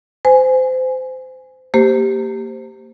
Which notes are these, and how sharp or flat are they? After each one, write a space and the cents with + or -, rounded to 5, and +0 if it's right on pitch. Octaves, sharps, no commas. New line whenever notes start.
C5 -25 G#5 +0
A#3 -25 G4 +0 C5 +0